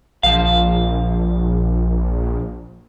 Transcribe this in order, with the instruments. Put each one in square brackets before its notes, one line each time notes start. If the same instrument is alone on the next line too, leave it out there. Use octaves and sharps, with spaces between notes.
[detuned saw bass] A#1 [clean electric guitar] F3 F5